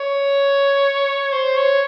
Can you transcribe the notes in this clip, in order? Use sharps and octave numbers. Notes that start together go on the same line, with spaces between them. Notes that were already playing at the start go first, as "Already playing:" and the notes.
Already playing: C#5
C5
C#5